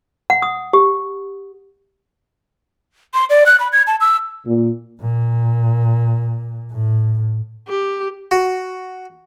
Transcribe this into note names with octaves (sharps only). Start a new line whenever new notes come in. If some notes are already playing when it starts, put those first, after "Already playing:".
F#5
D#6
G4
C6
D5
F#6
B5
G#6
A5
E6
A#2
A#2
A2
G4
F#4